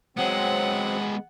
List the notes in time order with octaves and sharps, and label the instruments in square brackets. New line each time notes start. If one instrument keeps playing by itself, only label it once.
[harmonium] F#3 C4 [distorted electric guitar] G#3 B3 [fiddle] F#5